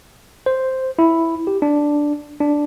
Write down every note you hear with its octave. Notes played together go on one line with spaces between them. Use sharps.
C5
E4
G4
D4
D4